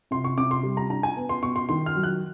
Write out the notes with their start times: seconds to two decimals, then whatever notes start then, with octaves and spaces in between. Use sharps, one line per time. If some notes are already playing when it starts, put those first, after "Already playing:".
0.11 C3 C6
0.24 C#6
0.38 C3 D6
0.51 C6
0.63 G3
0.77 A#5
0.90 D4 A#5
1.03 G#5
1.17 B3
1.29 C6
1.42 B2 C#6
1.56 C6
1.69 D#3 C6
1.86 F6
1.96 F#3
2.03 F#6